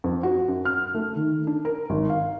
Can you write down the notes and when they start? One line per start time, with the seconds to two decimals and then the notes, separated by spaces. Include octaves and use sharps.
0.04 F2
0.23 F#4
0.48 F#2
0.65 F6
0.94 A3
1.16 D#3
1.47 D4
1.65 A#4
1.90 G#1
2.10 F5